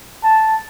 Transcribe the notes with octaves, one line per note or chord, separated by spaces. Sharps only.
A5